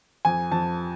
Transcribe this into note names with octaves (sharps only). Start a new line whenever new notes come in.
F2 G#5
F2 A5